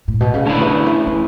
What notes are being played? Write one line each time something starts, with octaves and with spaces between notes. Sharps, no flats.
A2
B2
C#3
D3 A3 C#4 E4 G#4 B4
E3
D3
E3
E3